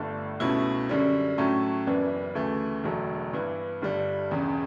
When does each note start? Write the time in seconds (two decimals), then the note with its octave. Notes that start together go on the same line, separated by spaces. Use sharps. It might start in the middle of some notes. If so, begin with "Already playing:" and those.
Already playing: G1 G2 D3 A3
0.40 C#2 B2 A3 C#4 E4
0.89 F#2 D3 G3 C#4
1.38 A2 F#3 A3 C#4
1.86 F#1 F#2 E3 B3 D4
2.35 D2 C#3 E3 A3
2.84 E1 E2 D3 F#3 A3
3.33 G2 E3 B3 E4
3.82 G1 G2 D3 G3
4.30 E1 E2 C#3